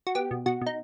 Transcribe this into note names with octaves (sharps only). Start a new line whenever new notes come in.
F#4
B3 G4
B2
B2 F#4
B2 D#4